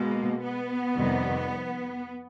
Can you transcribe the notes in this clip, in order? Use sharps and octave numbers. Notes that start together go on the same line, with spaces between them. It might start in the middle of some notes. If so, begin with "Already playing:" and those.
Already playing: B2 G#3 A#3
B3
F2 C3 D#3 G3